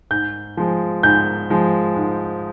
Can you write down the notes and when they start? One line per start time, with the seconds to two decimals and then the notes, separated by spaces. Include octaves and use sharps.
0.11 G#2 G6
0.57 F3 G#3
1.03 G#2 G6
1.50 F3 G#3
1.96 G#2